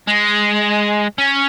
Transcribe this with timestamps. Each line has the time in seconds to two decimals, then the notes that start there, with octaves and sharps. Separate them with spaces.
0.08 G#3
1.18 C#4